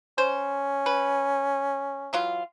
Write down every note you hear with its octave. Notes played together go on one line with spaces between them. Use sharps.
C#4 C5
B4
E3 F#3 F4